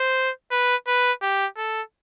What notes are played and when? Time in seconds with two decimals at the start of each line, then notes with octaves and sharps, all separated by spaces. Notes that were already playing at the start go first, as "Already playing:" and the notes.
Already playing: C5
0.51 B4
0.88 B4
1.22 G4
1.57 A4